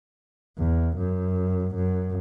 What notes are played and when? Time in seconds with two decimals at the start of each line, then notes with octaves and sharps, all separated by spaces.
0.58 E2
0.97 F#2
1.75 F#2